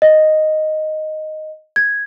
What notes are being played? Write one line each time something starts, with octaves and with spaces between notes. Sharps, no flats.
D#5
G#6